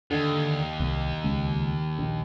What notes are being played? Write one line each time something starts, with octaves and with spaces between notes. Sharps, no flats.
D#2 D3
C2
C#2
A#1